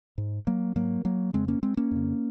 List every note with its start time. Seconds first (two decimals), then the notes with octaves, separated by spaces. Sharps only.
0.18 G#2
0.47 F#3 A#3
0.76 G#2 F#3 A#3
1.05 F#3 A#3
1.33 F2 C#3 G#3 C4
1.48 A#3 C#4
1.63 G#3 C4
1.77 A#3 C#4
1.91 F2 C#3